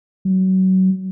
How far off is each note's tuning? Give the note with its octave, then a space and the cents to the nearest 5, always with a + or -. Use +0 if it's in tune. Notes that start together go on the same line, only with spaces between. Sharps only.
F#3 +25